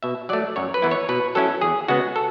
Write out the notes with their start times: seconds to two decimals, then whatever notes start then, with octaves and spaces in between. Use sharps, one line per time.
0.03 B2 E5
0.29 F#3 A3 D5
0.56 F#2 C#5
0.74 B4
0.82 E3 B3 E4
0.91 C#5
1.09 B2 B4
1.35 F#3 C#4 E4 A4
1.61 E2 G#4
1.88 C#3 G#3 B3 F#4
2.16 A4